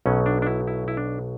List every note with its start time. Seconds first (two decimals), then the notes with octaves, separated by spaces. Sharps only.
0.06 B1 B2 F#3 C#4
0.26 D4
0.42 D4
0.47 E4
0.67 E4
0.88 E4
0.97 D4